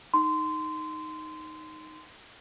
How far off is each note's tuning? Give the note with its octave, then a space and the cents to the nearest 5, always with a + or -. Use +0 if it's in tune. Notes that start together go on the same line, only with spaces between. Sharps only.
D#4 +0 C6 -20